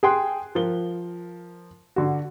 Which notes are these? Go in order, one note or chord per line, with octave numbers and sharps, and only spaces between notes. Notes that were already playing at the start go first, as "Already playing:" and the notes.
G#4 G5 C6 F#6
F3 A#4 G7
D3 F#4